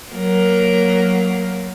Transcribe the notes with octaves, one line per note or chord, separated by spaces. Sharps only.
F#3 A#3 A#4